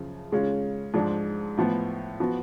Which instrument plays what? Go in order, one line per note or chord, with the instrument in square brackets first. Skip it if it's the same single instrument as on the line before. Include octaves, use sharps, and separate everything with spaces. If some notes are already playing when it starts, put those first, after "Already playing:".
Already playing: [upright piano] F#2 C#3 F3
C#3 G#3 C#4 F4
G#2 F3 G#3 D4
A2 F3 B3
F3 B3 F#4